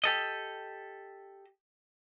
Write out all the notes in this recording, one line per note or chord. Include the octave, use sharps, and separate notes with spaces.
G4 A4 D#5